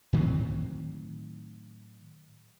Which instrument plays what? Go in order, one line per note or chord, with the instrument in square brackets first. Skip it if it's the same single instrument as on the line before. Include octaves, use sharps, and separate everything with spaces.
[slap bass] A2 D#3 F#3 C4